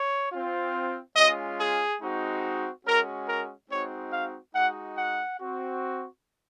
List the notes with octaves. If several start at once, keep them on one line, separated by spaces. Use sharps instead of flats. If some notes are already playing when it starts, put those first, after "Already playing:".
Already playing: C#5
C4 F4
G#3 C#4 F4 D#5
G#4
G#3 C4 D#4 F#4
G#3 C#4 F#4 A#4
A#4
G#3 C4 D#4 F#4 C#5
F5
G#3 D#4 F#4 F#5
F#5
C4 F#4